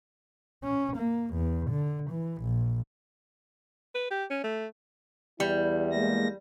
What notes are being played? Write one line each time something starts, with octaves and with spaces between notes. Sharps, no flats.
C#4
A#3
E2
D3
E3
A#1
B4
G4
C#4
A3
E2 G3 E4
G#3 A#3 A#6